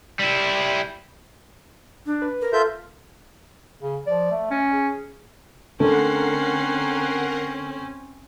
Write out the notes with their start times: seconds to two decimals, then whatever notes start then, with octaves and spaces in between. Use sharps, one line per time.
0.19 G3 E4
2.06 D4
2.22 B4
2.42 A#4
2.53 F4 A4 E5 G6
3.81 C#3
4.07 F3 D5
4.31 A3
4.50 C#4 D#5
4.72 G#4
5.80 D3 A3 C4 C#4 A#4 F#5 C7